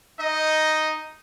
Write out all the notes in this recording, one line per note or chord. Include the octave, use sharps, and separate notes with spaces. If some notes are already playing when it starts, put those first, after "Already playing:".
D#4 D#5